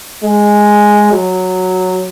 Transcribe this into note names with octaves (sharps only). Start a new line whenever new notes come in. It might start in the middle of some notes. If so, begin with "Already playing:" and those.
G#3
F#3